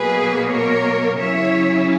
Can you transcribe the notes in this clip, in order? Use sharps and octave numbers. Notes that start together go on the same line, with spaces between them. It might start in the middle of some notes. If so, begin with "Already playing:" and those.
Already playing: B2 F#3 A#3 G#4 B4
A#4 C#5
C#3 F#3 C#4 E4 C#5 E5